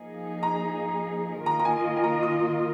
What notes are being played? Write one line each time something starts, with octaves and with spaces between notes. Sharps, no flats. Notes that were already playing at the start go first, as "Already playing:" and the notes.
Already playing: F3 A#3 D#4 G#4
A#5
D#3 A#3 F4 A#4 D#5 A#5
A#5
G#5
G#5
A#5
D#6